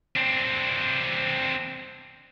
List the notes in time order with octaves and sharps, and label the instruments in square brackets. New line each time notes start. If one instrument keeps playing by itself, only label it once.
[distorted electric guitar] C4 D4